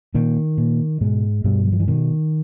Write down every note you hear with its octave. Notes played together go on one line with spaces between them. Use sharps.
A#2 D#3
A#2
G#2 B2 G#3
G2 B2 G3
F#3
F3
E3
B2 D#3